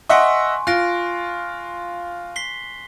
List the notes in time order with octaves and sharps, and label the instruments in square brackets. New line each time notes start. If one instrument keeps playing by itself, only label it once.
[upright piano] D#5 E5 F#5 [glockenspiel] G#5 C6 C#6
[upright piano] F4 [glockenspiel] F#6 A#6 D7
[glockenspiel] B6 C7 G7